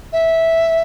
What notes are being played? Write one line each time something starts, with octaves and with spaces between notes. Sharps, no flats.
E5